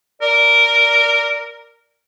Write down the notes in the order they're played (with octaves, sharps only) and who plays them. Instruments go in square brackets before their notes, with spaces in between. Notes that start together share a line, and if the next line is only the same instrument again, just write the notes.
[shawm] A#4 [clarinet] D5